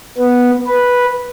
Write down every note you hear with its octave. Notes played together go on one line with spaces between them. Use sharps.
B3
B4